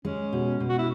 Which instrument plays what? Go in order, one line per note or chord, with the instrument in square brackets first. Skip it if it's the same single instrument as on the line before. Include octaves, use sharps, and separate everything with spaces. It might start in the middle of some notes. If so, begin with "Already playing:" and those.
[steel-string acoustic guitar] G#3 [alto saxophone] C#4
[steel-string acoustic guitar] B2
B2
[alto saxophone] F#4
E4